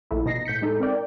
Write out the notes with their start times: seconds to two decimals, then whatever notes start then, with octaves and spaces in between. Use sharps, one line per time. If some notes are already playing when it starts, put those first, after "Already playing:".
0.11 A#1 A#2 A3 E4
0.26 B2 D#4 A#6 C7
0.45 A2 G6 B6 C#7
0.61 A2 G#3 D#4 A4
0.80 C4 A#4 D5 G5